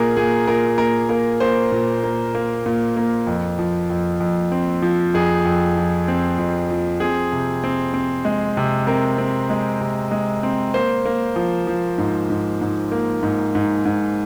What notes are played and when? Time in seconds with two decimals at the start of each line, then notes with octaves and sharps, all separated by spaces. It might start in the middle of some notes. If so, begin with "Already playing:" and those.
Already playing: A#2 A#3 G#4 A#4
0.16 A#2 G#4
0.47 A#2 A#4
0.78 A#3 A#4
1.09 A#3 A#4
1.40 A#3 C5
1.72 A#2
2.04 A#3
2.35 A#3
2.66 A#2
2.97 A#3
3.27 F2
3.59 F3
3.90 F2
4.20 F2
4.52 C4
4.82 F3
5.14 F2 G#4
5.45 F2
5.76 F3
6.08 C4
6.38 F2
6.70 F3
7.00 C4 G#4
7.33 C3
7.64 C4
7.94 C4
8.25 G#3
8.57 C3
8.87 C4 A#4
9.18 C4
9.50 G#3
9.81 C3
10.11 G#3
10.43 C4
10.74 A#3 C5
11.05 A#3
11.36 F3
11.67 F3
11.98 G#2
12.30 G#2
12.61 G#2
12.92 A#3
13.23 G#2
13.55 G#2
13.85 G#2